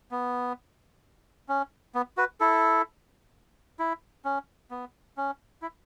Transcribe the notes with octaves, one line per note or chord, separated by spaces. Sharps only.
B3
C#4
B3
F#4 B4
E4 A4
E4
C#4
B3
C#4
E4